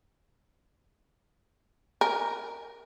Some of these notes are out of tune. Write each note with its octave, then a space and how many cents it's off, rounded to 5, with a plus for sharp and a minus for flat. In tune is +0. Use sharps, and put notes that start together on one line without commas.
A#4 +0 G#5 +0